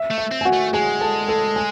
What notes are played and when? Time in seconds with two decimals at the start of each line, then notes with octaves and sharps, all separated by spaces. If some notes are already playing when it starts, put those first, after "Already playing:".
Already playing: E5
0.10 A3
0.18 E5
0.31 C4
0.41 G#5
0.45 F#4 F#5
0.53 A3
0.73 G#3 G#4 G#5
1.01 A4 A5
1.28 A4 A5
1.56 G#5